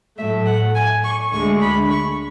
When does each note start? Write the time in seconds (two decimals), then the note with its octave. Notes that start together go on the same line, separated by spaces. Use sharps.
0.17 A2 F#3 A3 E5
0.46 F#5
0.75 G#5
1.03 C#6
1.32 D2 D3 G#3 C#6
1.61 B5
1.90 C#6